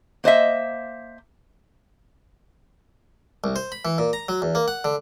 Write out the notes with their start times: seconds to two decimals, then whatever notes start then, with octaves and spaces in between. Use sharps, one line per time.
0.24 A#3 C5 D#5 E5
3.44 C2
3.56 C5
3.72 B5
3.85 E3
3.98 A#2
4.13 A#5
4.29 F#3
4.42 E2
4.55 A#3
4.68 F#5
4.84 D3